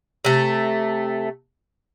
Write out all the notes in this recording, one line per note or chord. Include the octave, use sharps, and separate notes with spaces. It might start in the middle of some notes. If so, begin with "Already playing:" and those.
C3 A3